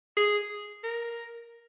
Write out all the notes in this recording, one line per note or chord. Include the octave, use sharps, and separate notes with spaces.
G#4
A#4